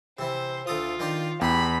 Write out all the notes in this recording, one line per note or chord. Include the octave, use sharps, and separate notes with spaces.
C3 E3 C5
D2 F4 A4 D#6
D#3 D4 C5
E2 G4 B5 C6